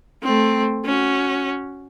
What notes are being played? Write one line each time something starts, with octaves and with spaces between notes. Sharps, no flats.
A3 C4
C#4 F#4